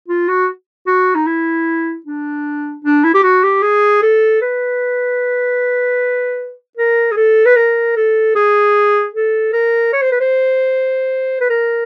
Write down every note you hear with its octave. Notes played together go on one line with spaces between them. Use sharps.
F4
F#4
F#4
D#4
E4
D4
D4
E4
G4
F#4
G4
G#4
A4
B4
A#4
G#4
A4
B4
A#4
A4
G#4
A4
A#4
C#5
C5
B4
C5
B4
A#4